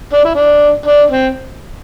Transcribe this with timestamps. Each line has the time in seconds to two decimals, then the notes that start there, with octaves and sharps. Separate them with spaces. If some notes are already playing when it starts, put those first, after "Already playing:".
0.13 D4
0.25 E4
0.35 D4
0.86 D4
1.10 C4